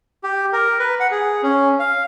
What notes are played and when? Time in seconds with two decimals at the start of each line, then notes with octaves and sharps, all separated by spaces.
0.23 G4
0.53 A#4
0.79 B4
1.00 F#5
1.11 G#4
1.43 C#4
1.79 F5